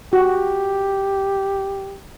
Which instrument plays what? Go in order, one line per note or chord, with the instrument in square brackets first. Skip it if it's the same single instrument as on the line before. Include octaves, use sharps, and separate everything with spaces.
[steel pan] F#4 [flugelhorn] G4